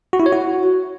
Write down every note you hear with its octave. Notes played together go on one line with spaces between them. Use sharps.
F#4
E4
C#5
F#4